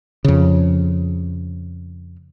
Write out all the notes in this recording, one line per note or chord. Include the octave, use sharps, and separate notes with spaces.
F2 C#3